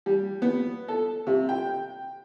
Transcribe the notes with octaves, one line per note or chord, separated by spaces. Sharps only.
G3
B3
A4
C3
G5